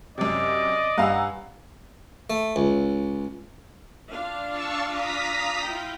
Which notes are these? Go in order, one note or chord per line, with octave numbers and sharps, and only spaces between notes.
F#2 C3 D5 D#5
G2 F5 F#5 G#5 A#5 E6
A3
C#2
D4 F4 F5
A5 C#6 E6
A#5 D#6 B6
E4 F4 G5